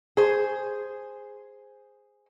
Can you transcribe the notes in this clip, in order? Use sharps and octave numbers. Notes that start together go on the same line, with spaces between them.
G#4 C5